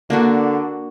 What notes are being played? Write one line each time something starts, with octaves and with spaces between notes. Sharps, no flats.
D3 A#3 D4 F#4